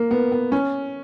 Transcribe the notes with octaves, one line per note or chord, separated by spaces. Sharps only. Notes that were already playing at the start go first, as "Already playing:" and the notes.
Already playing: A#3
B3
B3
C#4